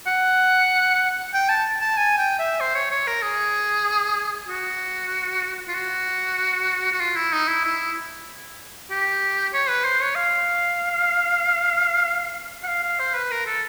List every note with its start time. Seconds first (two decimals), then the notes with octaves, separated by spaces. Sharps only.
0.07 F#5
1.34 G5
1.49 A5
1.81 A5
1.97 G#5
2.18 G5
2.39 E5
2.60 C5
2.75 C#5
2.91 C#5
3.08 A#4
3.22 G#4
4.48 F#4
5.68 F4
5.75 F#4
6.92 F#4
7.00 F4
7.16 E4
7.33 D#4
7.48 E4
7.64 E4
8.91 G4
9.54 C#5
9.69 B4
9.84 C5
10.01 C#5
10.15 F5
12.63 F#5
12.68 F5
12.83 F5
13.00 C5
13.15 B4
13.31 A#4
13.47 A4